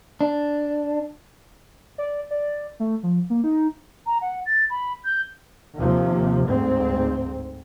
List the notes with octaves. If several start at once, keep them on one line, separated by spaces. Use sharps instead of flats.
D4
D5
D5
A3
F3
A#3
D#4
A#5
F#5
A6
B5
G6
D#2 C3 F3
D2 G#2 C4